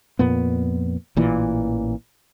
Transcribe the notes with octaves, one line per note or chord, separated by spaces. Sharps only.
F2 A#2 B3
A1 A#2 E3